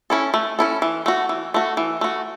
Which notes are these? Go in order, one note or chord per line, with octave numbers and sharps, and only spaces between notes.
C#4 E4 A4
A3
C#4 E4 A4
E3
A3 F#4
E3
A3 F#4
E3
A3 F#4